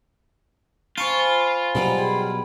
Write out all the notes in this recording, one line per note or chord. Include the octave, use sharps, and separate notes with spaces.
F4 C5 G#5 A5 B5 C#6
B2 F#3 G3 B3
G#4 G5 B5